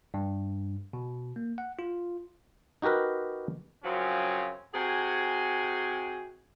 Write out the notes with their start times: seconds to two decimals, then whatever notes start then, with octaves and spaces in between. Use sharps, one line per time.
0.14 G2
0.93 B2
1.36 A#3
1.58 F#5
1.79 F4
2.82 D#4 F#4 G4 A#4 B4
3.83 F#2 C#3 F3 F#3 C4 C#4
4.74 C3 F#4 G#4 G5 G#5